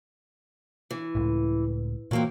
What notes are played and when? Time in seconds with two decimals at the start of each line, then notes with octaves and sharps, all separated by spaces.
0.91 E3
1.15 C#2 A2
2.11 A#2 E3 F#3 A#3 C4